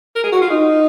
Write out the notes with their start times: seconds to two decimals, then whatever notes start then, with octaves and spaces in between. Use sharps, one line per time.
0.15 A#4
0.24 G#4
0.32 F#4
0.42 F4
0.50 D#4